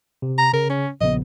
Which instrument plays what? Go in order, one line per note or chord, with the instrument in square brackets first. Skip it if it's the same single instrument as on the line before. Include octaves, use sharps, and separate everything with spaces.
[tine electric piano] C3
[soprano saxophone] A#5
[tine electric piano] C#3 [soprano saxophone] A#4
[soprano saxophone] C#4
[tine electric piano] A#1 C#3 B3 [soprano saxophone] D#5